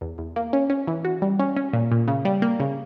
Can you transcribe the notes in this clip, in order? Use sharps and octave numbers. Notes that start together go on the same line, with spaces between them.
E2
E2
A#3
C#4
C#4
E3
F#4
G3
C#4
C#4
A#2
A#2
C#3
G3
A#3
C#3